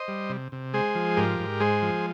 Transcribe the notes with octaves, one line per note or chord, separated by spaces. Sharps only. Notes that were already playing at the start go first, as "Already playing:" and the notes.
Already playing: C5 D#5
G3
C3
C3
G#3 G#4 C5
F3
G#2 G4 A#4
G#2
G#3 G#4 C5
F3